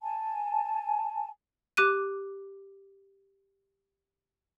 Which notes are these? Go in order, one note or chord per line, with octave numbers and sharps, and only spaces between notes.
G#5 A5
G4 D6 F#6 D#7